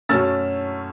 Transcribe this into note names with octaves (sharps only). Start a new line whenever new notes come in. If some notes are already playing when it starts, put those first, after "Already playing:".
F#2 F#3 A3 C#4 E6 A6